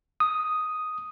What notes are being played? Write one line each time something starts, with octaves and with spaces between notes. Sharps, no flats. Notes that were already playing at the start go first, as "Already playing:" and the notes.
D#6